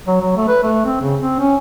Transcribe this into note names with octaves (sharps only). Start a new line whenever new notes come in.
F#3
F#3
A3
B4
A3
C4
C#3
C4
C#4